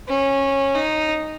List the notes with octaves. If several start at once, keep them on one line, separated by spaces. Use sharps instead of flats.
C#4
D#4